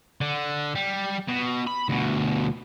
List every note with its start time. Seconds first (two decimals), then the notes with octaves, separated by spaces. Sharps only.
0.21 D3
0.75 G3
1.28 B2
1.67 B5
1.89 D2 B2